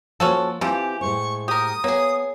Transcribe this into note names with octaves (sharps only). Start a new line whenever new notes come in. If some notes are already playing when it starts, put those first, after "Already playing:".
F3 A#3 C#4 F#4 A4 C5
E3 F3 C4 G4 G#5
A2 G#3 C5 C#6
G4 A#4 D#6
A#3 B3 G#4 C#5